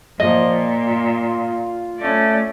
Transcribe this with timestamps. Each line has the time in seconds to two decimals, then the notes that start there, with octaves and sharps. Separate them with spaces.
0.20 A#2 F3 D#5
0.88 F4
1.97 A3 C#4 D5